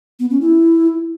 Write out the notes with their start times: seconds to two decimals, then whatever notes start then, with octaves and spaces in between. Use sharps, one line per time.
0.19 B3
0.30 C#4
0.41 E4